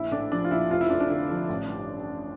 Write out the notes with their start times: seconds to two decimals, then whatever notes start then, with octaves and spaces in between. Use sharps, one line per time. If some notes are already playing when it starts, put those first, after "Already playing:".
Already playing: A#1 E4
0.11 A2 D4
0.32 F3 D4
0.45 F4
0.51 A#1 E4
0.71 F1 F4
0.81 E4
0.90 F2 D4
1.00 D4
1.10 D3
1.30 F3
1.49 A1
1.69 G2